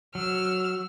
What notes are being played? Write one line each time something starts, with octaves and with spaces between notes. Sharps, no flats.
F#3 E6 F6